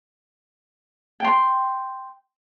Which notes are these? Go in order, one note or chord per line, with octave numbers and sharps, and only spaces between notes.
G5 C6